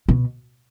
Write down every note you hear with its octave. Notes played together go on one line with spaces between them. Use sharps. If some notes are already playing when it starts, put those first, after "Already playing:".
B2